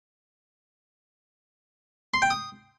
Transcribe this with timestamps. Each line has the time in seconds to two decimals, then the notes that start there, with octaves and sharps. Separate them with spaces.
2.14 C6
2.22 G5
2.30 D#6